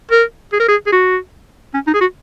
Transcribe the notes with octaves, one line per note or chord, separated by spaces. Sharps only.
A#4
G#4
A#4
G#4
G#4
F#4
C#4
D#4
G#4
F#4